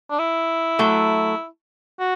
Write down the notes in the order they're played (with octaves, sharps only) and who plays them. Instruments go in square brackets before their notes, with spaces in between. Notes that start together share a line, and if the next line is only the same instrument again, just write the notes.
[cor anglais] D4
E4
[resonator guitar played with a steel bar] F#3 A3
[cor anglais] F#4